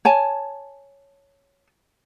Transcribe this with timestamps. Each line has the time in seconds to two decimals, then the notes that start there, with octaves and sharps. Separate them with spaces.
0.05 C#5 G#5 A5